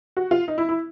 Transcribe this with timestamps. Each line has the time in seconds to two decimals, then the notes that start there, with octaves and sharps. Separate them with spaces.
0.17 F#4
0.31 F4
0.48 D#4
0.58 E4
0.69 E4